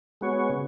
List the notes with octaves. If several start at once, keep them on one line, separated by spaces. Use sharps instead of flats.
G#3 B3 F#4 C#5
C#3